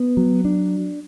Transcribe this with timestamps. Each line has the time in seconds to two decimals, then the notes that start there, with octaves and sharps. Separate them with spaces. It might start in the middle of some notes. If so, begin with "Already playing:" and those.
Already playing: B3
0.17 F#3
0.45 D4